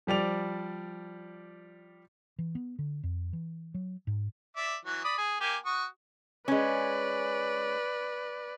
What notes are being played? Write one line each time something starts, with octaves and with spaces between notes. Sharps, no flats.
F3 G3 D5 F7
E3
B3
D3
F2
E3
F#3
G#2
D5 E5
E3 F#3
D5 B5 D#6
G#4
A#3 G4 G#5
F#4 C#6 D#6
G#3 C#4 B4 D5